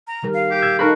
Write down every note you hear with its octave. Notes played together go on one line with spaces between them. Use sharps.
A#5
D#3 G3 A#4
F5
G4
E6 G#6
D#4 F#4 A4 A#4 B5